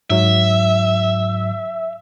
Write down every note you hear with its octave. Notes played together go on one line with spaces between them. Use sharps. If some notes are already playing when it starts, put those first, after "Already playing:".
G#2 F#3 E5